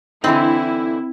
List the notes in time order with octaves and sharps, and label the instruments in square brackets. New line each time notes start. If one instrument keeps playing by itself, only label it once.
[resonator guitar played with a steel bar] D3 E3 D#4 [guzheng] C4 [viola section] E4